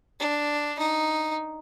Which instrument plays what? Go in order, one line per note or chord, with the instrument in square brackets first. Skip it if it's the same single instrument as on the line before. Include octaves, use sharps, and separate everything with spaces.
[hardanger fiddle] D4
D#4